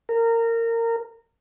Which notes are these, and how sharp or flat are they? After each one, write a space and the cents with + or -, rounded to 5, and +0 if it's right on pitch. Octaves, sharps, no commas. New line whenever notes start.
A#4 -20